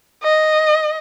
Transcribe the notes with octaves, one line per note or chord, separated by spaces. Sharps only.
D#5